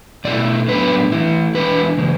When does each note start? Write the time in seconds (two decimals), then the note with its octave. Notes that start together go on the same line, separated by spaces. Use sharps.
0.25 B2 A3 E4 D5
0.68 A2 F#3 B3 D4 B4
1.12 E3 A3 E4
1.55 E3 G#3 D4 B4
1.98 C#3 E3 G#3